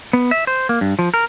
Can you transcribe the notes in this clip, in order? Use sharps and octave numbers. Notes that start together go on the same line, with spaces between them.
B3
E5
C5
A#3
G2
F3
A#4